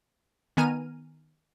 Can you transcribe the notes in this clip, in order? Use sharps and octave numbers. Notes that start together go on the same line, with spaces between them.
D#3 B3 G#5 A#5 F6 D#7